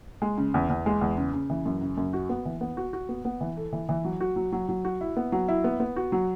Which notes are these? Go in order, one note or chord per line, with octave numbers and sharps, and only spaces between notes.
G#3
C#3
E2
E2
G#3
E2
C#3
C#3
E3
F#2
C#3
F#2
F#4
B3
E3
B3
F#4
F#4
B3
B3
E3
A4
E3
E3
F#3
F#4
F#3
F#3
F#3
F#4
E4
B3
F#3
E4
B3
B3
F#4
F#3